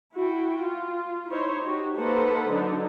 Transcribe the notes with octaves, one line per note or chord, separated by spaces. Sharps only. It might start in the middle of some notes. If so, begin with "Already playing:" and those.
E4 F#4 G5
F4
D#4 E4 C5 C#5
D#4 F#4 G4
A#3 D#4 A4 B4 C5 F#5
D3 F#3 D4 D#4